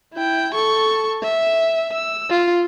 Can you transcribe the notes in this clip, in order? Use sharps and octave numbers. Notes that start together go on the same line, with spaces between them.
E4 G5
A4 C#6
E5
E6
F4